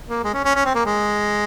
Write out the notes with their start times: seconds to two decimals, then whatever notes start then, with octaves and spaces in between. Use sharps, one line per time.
0.08 A#3
0.24 G#3
0.34 C#4
0.44 C#4
0.55 C#4
0.65 C4
0.75 A#3
0.85 G#3